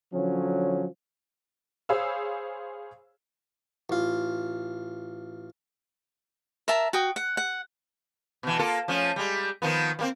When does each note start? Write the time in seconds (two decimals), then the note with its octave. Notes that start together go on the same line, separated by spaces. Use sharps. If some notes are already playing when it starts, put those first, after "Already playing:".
0.13 D3 F3 F#3 C#4
1.89 G#4 C5 C#5 F5 B5 E6
3.89 A1 F4
6.68 A#4 E5 A5 A#5
6.93 F#4 G5 D#6
7.16 F#5
7.37 F#5
8.43 B2 E3
8.59 A#3 F4 A4
8.88 F3 A3 C#4
9.16 G3 G#3
9.62 D#3 F3 B3
9.99 G3 A#3 C4